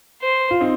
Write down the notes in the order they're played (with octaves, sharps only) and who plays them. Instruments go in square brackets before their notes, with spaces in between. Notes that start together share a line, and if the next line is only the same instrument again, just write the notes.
[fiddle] C5
[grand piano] F4
C4 D#4